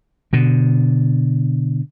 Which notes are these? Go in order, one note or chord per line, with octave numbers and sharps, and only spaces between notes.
B2 D3